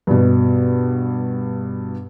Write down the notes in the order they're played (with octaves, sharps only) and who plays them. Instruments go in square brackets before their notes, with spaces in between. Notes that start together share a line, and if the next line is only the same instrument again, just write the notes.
[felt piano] G2 B2